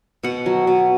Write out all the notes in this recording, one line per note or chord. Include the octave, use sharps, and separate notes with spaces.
B2 F#5
F#3
B2